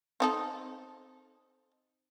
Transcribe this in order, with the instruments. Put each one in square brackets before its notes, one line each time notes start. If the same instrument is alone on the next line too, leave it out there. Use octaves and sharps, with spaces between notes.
[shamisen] C4 D#4 A4